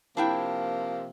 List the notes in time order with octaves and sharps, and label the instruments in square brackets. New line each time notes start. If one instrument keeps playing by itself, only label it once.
[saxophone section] C3 F3 A#3 [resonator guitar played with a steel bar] D4 E4 G5